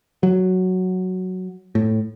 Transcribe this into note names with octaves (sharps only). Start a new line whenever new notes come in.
F#3
A2